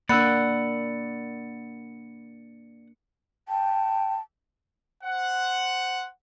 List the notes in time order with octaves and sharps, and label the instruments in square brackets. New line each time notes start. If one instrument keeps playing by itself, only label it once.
[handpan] A#3 D4 [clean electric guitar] D5 F#5 [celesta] B5 E6 [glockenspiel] C#7
[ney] G5 [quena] A5
[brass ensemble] C5 F#5